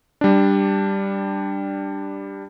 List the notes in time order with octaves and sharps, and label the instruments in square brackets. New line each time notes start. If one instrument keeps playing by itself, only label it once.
[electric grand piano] G3 D4